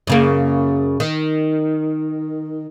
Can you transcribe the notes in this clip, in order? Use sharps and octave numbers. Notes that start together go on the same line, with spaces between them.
F#2 C#3 A#3
D#3